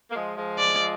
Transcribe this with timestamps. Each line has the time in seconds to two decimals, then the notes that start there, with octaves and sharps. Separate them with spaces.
0.10 A#3
0.15 F3 G#3
0.37 F3 G#3
0.58 D5